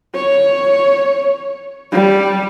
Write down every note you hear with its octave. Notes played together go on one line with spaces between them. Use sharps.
C#5
G3